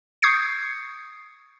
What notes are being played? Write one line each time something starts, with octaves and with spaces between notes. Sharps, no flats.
C#6 D#6 G6 G#6 C7 C#7